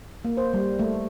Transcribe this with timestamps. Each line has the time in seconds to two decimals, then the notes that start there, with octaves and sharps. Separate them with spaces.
0.25 A#3
0.37 C5
0.54 G3
0.79 A3